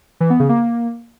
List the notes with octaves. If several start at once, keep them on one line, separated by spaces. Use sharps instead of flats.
E3
B3
C#3
A#3